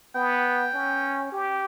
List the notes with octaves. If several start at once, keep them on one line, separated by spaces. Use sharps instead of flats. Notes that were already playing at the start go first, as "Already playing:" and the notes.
B3 G5
C#4
G4